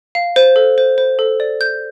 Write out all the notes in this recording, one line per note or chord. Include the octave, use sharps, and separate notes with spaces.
F5
C5
A4
C5
C5
A4
D5
G6